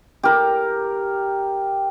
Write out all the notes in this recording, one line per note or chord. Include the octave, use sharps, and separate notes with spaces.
G4 A#4